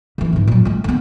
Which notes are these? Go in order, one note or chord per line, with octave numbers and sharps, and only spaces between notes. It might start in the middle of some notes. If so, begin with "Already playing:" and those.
C#3 E3
G#2 B2
A#2 F#3
G#3 A3
D3 B3